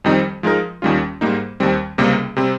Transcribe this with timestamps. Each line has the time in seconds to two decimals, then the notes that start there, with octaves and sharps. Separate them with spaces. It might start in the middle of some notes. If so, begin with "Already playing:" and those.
0.04 F2 D#3 G3 C4 D#4
0.43 F3 G#3 D#4 A#4
0.82 D#2 D#3 G3 C#4 F4
1.21 G#2 G3 A#3 D#4
1.60 D#2 D#3 G3 C4
1.98 C#2 C3 G3 A#3
2.36 C3 G3 C4